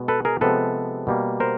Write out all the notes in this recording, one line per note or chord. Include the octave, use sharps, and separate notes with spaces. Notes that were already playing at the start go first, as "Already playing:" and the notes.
Already playing: B2 G#3 B3
A4 B4
G#4 A#4
C3 F3 G#3 B3 A4 B4
B2 G3 A#3
A#4 C5